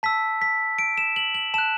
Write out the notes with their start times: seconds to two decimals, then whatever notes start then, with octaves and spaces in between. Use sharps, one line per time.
0.03 A5 E6 B6
0.42 B6
0.79 D7
0.98 E7
1.16 F#7
1.35 F#7
1.54 A5 F#6 E7